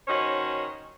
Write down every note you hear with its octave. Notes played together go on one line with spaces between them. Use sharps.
D#3 C#4 F#4 C5 C#5 D#5